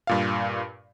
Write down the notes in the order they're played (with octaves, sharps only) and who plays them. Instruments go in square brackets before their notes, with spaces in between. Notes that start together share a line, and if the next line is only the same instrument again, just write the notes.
[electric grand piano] G2 A#2 F5